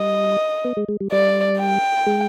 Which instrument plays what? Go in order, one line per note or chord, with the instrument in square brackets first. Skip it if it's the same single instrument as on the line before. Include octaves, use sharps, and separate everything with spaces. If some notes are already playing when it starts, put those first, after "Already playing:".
Already playing: [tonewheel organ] G3 [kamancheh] D#5
[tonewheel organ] B3
G#3
G#3
G3
[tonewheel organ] G3 [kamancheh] D5
[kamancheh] G5
[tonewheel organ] G#3